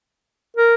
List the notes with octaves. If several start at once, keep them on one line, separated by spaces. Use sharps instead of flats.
A#4